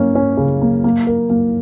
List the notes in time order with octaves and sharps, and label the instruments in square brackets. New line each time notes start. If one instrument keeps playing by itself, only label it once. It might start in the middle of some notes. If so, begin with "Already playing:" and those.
Already playing: [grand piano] A#3 C#4
C#4
C#3
A#3
A#3
A#4
A#3